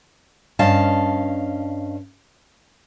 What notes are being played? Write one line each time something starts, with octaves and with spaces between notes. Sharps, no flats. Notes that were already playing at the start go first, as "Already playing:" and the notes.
G2 C#4 D#5 F5 A5